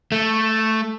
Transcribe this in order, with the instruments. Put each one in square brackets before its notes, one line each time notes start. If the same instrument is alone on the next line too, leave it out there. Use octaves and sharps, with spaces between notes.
[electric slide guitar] A3